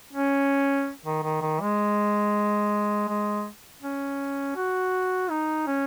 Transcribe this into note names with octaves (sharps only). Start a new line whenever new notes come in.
C#4
D#3
D#3
D#3
G#3
G#3
C#4
F#4
D#4
C#4